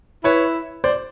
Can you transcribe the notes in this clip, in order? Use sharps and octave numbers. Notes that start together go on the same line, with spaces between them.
E4 B4 C#5
C5 D5